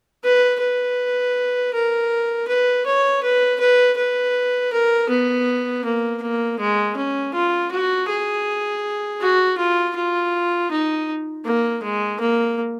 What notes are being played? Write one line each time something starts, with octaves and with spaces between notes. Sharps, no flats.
B4
B4
A#4
B4
C#5
B4
B4
B4
A#4
B3
A#3
A#3
G#3
C#4
F4
F#4
G#4
F#4
F4
F4
D#4
A#3
G#3
A#3